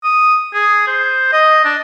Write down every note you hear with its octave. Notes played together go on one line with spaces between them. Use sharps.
D#6
G#4
C5
D#5
D4